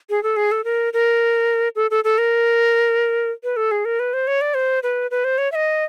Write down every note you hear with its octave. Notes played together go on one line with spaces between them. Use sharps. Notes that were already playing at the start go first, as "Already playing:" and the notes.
G#4
A4
G#4
A4
A#4
A#4
A4
A4
A4
A#4
B4
A4
G#4
A#4
B4
C5
C#5
D5
C5
B4
B4
C5
C#5
E5
D#5